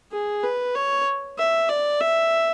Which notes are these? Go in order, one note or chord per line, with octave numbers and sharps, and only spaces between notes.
G#4
B4
C#5
E5
D5
E5